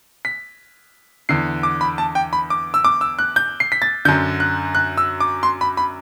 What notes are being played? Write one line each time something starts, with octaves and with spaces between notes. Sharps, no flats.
B6
E2 D3 C7
D6
B5
A5
G5
B5
D6
E6
D6
E6
F#6
G6
C7
B6
A6
F#2 D3 G6
F#6
F#6
E6
D6
C6
B5
B5